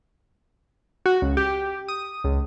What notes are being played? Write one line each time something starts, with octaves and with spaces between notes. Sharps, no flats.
F#4
C#2
G4
D#6
C#2